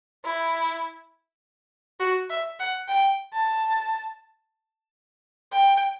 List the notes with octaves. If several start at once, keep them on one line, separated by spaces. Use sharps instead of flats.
E4
F#4
E5
F#5
G5
A5
G5